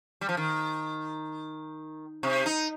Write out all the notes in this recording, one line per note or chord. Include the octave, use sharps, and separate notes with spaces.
G3
F3
D#3
C3
D#4